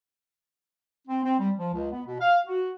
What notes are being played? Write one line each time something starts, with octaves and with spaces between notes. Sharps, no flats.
C4
C4
G3
F3
C#2
B3
B2
F5
F#4